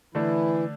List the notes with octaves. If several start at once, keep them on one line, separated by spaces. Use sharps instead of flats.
D3 E3 A3 D4 E4